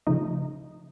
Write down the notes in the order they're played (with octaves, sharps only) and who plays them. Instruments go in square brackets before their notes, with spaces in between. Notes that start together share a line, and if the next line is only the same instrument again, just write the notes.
[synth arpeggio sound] C#3 F3 A3 D#4 D#5